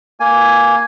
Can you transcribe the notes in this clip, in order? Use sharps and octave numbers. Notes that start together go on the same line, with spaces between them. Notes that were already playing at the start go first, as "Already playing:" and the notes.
A#3 G#5